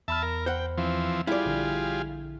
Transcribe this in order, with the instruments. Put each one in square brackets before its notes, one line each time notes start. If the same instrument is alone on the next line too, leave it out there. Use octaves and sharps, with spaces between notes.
[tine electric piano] E2 B5 F6 [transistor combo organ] E5 A5
[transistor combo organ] A#4
[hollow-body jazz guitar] C5 F#5 [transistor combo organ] G5
[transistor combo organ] E3 F3 C4
[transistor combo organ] G3 F4 G#4 [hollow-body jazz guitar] E4 D5
[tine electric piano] A#1 D3